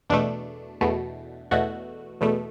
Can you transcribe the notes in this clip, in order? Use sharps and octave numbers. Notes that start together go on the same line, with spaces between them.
E2 B2 A3 D4
E2 B2 A3
E2 B2 A3 F#4
E2 B2 A3